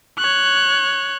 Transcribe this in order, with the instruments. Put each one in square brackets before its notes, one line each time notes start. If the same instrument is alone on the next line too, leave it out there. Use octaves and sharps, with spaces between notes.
[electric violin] C#5 F#6